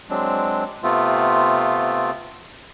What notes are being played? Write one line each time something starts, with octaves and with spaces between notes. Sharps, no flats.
F#3 G#3 C4 D4
C3 A3 B3 C4 F4